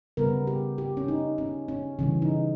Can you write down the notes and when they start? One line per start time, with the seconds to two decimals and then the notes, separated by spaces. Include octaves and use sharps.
0.17 C#3 G3 B3 A#4
0.47 G4
0.78 G4
0.97 C#4
1.08 D#4
1.38 C#4
1.68 C#4
1.99 C#3 E3 G3 C#4
2.22 D#4